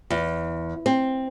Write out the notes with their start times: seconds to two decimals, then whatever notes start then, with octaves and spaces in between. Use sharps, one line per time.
0.10 E2
0.86 C4